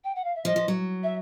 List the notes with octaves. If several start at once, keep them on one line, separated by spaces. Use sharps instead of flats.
G5
F#5
F5
E5
F3 D#5
F3
F#3
E5